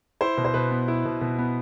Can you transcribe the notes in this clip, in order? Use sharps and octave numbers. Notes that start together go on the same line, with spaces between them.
E4 C5
B2
C5
B2 B4
B3
E4
B2
B2
B3